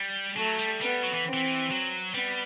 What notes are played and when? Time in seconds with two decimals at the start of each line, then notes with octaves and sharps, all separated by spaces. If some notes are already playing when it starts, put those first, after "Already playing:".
Already playing: G3
0.36 F#3 A3
0.59 G3
0.81 G3 B3
1.03 F#3
1.14 E3
1.25 C4
1.33 E3
1.70 F#3
2.14 G3 B3